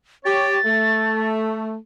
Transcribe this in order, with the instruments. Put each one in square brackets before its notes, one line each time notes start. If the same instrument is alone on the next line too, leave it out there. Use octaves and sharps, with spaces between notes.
[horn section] G4 C#5 [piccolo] A6
[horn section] A3